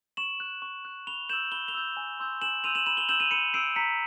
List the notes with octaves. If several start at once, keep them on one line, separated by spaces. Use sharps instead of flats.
C#6 E7 F#7
F#6
C#6
F#6
B5 F7 G7
E6 G6 E7 F#7
B5 G7
F7 G7
E6 G6
G#5
C6 E6 G6
G#5 E7 F#7
C6 E6 G6 D#7 F7
E7 F#7
B5 E7 F#7
F7 G7
E6 G6 E7 F#7
D#7 F7
B5 C#7 D#7
E6 G6 C7 D7
A#5 B6 C#7